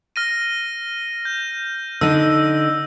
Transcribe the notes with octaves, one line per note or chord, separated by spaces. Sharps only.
F6 A#6 D#7
G6
D3 D#4 E6